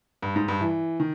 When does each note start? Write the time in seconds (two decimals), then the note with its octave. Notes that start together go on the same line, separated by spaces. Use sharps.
0.22 G2
0.36 G#2
0.48 G2
0.61 E3
1.00 D#3